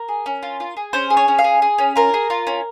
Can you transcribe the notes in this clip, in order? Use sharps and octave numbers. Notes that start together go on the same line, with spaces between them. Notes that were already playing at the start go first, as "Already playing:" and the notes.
Already playing: A#4
G#4
C#4
F4
F4
G#4
C#4 C5
G#4
C#5
C#4
F5
G#4
G#4
C#4
F4 A#4
G#4
F4
C#4